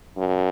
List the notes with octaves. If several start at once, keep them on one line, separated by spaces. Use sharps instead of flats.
F#2